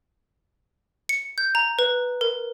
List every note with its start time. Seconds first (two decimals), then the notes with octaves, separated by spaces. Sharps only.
1.09 C#7
1.38 G6
1.55 A#5
1.79 B4
2.21 A#4